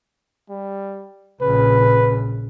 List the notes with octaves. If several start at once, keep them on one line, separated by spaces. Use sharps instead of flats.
G3
A#1 C#3 B4